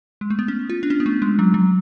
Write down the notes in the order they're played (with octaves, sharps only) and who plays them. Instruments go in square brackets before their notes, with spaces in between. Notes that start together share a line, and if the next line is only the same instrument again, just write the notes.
[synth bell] G#3
A3
B3
C#4
F4
D4
C#4
B3
A3
G#3
F#3
F#3